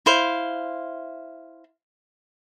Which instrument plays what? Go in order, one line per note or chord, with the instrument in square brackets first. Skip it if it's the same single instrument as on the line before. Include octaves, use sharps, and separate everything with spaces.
[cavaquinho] E4 C5 F5